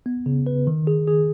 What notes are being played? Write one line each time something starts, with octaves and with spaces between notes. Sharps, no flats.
B3
C#3
B4
D#3
G#4
G#4